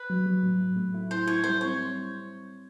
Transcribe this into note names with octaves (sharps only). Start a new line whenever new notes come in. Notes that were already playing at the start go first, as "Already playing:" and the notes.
Already playing: B4
F#3
F#3
A2
A2
A3
E4
E4 C5
E4 C#5
G3 C5
C4 C#5